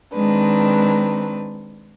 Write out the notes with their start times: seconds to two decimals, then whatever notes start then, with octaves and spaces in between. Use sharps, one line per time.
0.13 D#3 G#3 C4 D4 B4